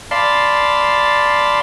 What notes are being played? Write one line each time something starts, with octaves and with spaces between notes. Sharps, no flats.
D5 F5 A5 B5 C6